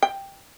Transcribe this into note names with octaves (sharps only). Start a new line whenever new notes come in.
G5